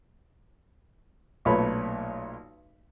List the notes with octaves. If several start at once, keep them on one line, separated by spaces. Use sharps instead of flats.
B1 A#2 A3 B4 C#5 B5